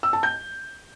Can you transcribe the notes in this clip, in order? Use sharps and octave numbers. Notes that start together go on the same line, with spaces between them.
E6
A5
G6